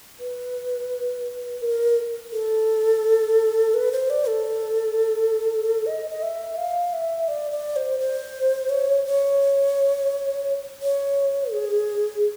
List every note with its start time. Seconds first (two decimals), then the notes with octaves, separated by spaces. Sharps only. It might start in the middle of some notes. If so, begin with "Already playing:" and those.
0.20 B4
1.62 A#4
2.33 A4
3.74 B4
3.92 C5
4.10 D5
4.28 A4
5.86 D#5
6.11 D#5
6.22 E5
6.57 F5
6.93 E5
7.28 D5
7.51 D5
7.76 C5
8.00 C5
8.70 C#5
9.06 C#5
10.82 C#5
11.53 G#4